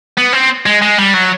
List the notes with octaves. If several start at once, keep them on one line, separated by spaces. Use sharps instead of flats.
B3
C4
G#3
G#3
G3
F#3